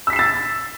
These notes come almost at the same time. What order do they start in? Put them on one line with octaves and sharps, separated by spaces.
E6 B6 C7 E7 A6